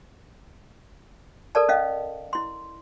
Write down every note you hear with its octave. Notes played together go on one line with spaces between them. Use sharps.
A4 A#4 D5 A5
C#4 D#5 F5
E4 C6